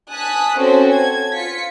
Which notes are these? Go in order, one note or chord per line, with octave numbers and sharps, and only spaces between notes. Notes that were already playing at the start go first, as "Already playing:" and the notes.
G#5 A5 D#6 F#6 B6
C4 C#4 F#4 A4 C5
G#6
F4 B6 C#7